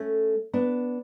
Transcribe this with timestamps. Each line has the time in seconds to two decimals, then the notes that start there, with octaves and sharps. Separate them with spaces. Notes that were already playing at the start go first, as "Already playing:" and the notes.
Already playing: A3 C#4
0.53 B3 D4